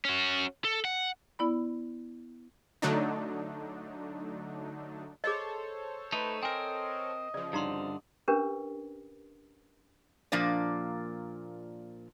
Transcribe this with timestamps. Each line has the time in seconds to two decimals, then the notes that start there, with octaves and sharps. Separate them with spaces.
0.05 C#4 F#4
0.65 A4
0.85 F#5
1.39 B3 E4 D5 B5
2.82 D3 F#3 A3 D4 D#4
5.24 G#4 A4 C5 C#5 D#5
6.12 A3 D#4 B4
6.43 C4 A#4 D#5 G5 G#5
7.34 C#3 F3 D5
7.53 G2 D3 D#4 A#5 C6
8.28 C#4 D4 G4 A#4 B4
10.32 A#2 F3 A#3 D4 D5